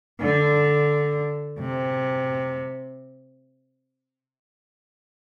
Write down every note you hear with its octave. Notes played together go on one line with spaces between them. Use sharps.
D3
C3